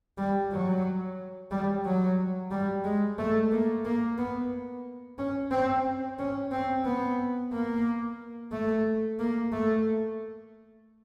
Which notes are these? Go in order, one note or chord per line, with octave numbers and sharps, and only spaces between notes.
G3
F#3
G3
F#3
G3
G#3
A3
A#3
A#3
B3
C#4
C4
C#4
C4
B3
A#3
A3
A#3
A3